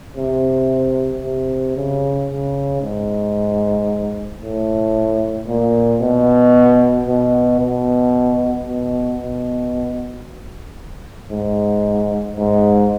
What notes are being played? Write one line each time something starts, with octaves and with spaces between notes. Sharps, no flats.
C3
C3
C#3
C#3
G#2
A2
A#2
B2
B2
B2
B2
B2
G#2
G#2